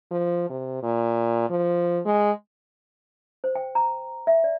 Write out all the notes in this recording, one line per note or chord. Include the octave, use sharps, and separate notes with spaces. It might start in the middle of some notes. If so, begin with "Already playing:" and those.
F3
C3
A#2
F3
G#3
C5
G5
A#5
E5
D5